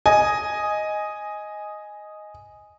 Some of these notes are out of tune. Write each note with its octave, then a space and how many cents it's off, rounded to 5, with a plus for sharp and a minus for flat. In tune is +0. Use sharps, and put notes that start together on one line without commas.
D#5 +0 G#5 +0